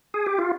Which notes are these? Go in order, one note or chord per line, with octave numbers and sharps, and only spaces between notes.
G#4
G4
F4